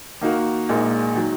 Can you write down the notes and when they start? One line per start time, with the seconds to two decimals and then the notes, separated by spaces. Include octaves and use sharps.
0.21 D#3 A#3 D#4 F#4 A#4
0.69 A#1 A#2 G#3 D#4 A#4
1.15 D#3 F#3